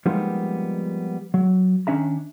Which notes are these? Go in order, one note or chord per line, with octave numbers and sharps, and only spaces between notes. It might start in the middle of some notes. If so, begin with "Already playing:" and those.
F3 G3 G#3 A#3 B3 D#4
F#3
D#3 C#4 D4 E5 A#5